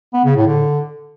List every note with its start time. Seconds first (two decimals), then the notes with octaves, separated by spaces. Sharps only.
0.14 B3
0.25 C#3
0.36 A2
0.47 D3